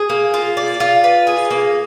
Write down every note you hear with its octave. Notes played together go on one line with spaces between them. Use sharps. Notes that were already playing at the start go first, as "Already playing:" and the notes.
Already playing: G#4
A#3
F4
D5
F4
B4
G#4
A#3